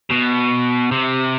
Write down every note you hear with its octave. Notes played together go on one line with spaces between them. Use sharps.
B2
C3